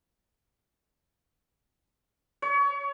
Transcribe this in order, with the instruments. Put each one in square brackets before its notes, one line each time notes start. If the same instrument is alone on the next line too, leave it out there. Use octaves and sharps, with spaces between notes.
[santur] C#5